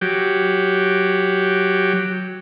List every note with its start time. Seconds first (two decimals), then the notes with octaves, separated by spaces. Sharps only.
0.01 F#3 G4